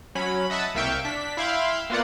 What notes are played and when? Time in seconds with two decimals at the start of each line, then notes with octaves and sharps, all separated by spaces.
0.15 F#3 C#4 B5
0.50 D#5 E5 F#5 A5 B5
0.75 C2 A#3 E5 F5 G5 C#6
1.05 D4 B6
1.37 E4 E5 F5 G5 B5 C6
1.90 A#3 B3 F4 D5 F#5